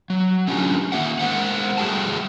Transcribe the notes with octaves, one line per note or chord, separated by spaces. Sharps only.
F#3
A3 C#4 D4 F4 G4 G#5
D#3 A#3 E5 F#5
G#3 A#4 C5 F#5
G3 A3 F#4 G#4 G5 A5